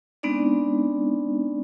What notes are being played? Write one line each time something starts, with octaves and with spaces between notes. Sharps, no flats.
G#3 B3 C4 D4 D#4 D5